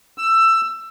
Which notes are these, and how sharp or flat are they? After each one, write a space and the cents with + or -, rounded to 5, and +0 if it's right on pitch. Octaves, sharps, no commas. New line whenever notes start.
E6 +15